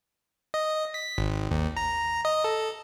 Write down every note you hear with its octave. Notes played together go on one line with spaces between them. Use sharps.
D#5
B6
G#1
D#2
A#5
D#5
A4